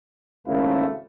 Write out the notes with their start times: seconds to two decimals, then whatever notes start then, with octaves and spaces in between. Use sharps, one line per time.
0.47 G#1 C#2 C#3 A3 A#3 E4